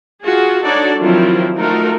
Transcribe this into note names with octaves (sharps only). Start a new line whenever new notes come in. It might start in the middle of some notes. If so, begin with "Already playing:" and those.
F4 F#4 G#4
D4 D#4 F#4 A4 C#5 D5
D#3 F3 F#3 C4 E4 F4
A3 D#4 F4 F#4 A#4